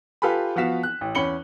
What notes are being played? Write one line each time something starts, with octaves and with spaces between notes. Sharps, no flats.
F4 G4 A4 B4 G#5 B5
F3 B3 F#4 F5 B6 E7
F#6
A1
E2 C#4 B5 C#7 F#7 G7